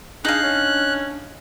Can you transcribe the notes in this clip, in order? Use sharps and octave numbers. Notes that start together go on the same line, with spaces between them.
D4 D#4 G#4 F5 F#6
C#4